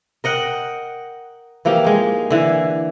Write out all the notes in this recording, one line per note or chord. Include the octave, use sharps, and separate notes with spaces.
A#4 D#5 F#5 G5
E3 F3 A#3 G4
G#3 D#4
D3 E3